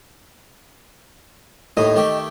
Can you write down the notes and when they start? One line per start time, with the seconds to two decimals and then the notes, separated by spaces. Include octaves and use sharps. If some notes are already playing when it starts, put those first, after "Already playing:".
1.77 D#2 A2 D#4 D#5
1.96 D#3 A3 G4